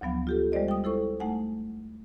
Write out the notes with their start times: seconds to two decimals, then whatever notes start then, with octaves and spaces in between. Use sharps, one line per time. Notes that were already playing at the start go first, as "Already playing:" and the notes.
0.01 D2 F3 F#3 B3 F5
0.27 F4 G4 A4
0.52 G3 G#3 C5 D5 D#5
0.68 G5 D#6
0.84 E4 A4 C5 C#6
1.20 A3 D#4 F#5 G#5